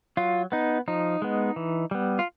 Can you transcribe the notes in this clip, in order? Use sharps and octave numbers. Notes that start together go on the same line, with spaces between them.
F#3 F4
B3 D#4
F3 D#4
G#3 B3
E3
G3 B3
F4